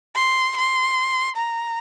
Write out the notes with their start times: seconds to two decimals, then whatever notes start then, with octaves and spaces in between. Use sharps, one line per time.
0.15 C6
0.56 C6
1.36 A#5